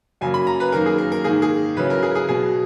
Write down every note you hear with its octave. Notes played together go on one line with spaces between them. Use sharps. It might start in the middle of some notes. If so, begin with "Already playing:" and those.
F#2 C#3 F#3 A#3 G#5
B5
A#5
B4
F#2 D#3 A#3 A#4
G#4
A#4
A#4
G#2 D#3 A#3 G#4
G#4
C#3 F#3 C#4 E4 B4
A#4
G#4
G#4
B2 F#3 B3 G#4